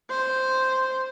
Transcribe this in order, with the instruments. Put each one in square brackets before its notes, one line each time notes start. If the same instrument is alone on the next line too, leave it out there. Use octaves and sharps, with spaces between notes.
[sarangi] C5